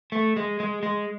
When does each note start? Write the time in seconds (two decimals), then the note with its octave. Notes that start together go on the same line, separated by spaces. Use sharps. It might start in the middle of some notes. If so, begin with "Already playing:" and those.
0.12 A3
0.36 G#3
0.60 G#3
0.83 G#3